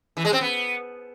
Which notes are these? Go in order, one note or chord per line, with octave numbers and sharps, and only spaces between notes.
E3
G#3
C4
B3